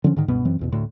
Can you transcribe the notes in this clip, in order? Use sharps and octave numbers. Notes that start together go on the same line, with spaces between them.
D3 F3 C#4
G#2 D3 D#3
C#2 G2 B2 B3
F#2 E3 C4
A1 E2 B2
D2 A2